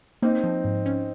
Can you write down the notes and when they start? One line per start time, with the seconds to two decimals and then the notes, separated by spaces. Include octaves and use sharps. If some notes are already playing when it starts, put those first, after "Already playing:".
0.22 A#3 C4 D#4
0.44 F3
0.64 G#2
0.86 C#4